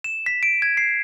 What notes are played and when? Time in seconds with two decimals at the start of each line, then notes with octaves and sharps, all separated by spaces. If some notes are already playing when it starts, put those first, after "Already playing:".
0.04 E7
0.26 B6
0.43 D7
0.62 G#6
0.77 C7